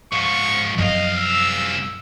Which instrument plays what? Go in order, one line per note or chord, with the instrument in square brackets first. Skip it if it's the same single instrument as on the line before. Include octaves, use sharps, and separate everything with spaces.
[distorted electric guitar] G#2 F3 [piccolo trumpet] C#6
[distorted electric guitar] C2 F5 [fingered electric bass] F#2 F3 [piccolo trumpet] D#5
[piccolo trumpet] E6